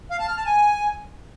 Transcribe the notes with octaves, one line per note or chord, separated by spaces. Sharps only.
F5
A5
F6
A5
G#5